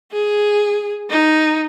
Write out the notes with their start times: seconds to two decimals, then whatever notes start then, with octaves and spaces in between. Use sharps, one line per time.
0.12 G#4
1.10 D#4